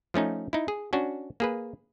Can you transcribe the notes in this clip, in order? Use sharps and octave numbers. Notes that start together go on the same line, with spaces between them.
F3 A3 C#4 D#4
D#4 E4
G#4
C#4 D4 F#4
A#3 G#4 B4